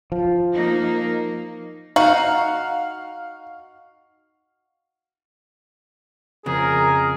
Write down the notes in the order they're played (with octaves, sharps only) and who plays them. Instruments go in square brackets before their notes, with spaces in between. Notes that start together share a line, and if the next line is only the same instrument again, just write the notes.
[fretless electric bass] F3
[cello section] A#3 D#4
[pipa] D#4 F#4 [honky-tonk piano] F5
[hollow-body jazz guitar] F2 C#3 [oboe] G#4 [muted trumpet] A#4